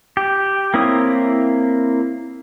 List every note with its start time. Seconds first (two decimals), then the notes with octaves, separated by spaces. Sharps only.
0.17 G4
0.74 A#3 C4 E4 C#5 D#6